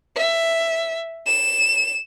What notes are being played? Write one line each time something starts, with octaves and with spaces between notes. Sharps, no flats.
E5
E7